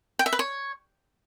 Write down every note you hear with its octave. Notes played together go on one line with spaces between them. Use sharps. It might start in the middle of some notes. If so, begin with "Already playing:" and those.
G5
E5
B4
C#5